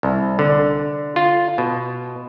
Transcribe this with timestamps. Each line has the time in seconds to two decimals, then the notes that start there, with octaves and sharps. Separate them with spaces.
0.03 C2
0.39 D3
1.16 F4
1.58 B2